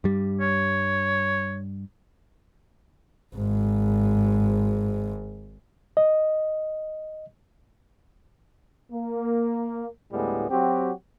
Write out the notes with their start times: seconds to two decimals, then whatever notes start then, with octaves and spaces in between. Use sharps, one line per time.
0.04 G2 G3
0.41 C#5
3.35 G#1 G#2
5.97 D#5
8.92 A#3
10.11 D2 A2 G3 G#3 B3
10.50 F#3 C4 F#4 G4